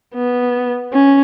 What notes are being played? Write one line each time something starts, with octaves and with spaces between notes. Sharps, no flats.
B3
C#4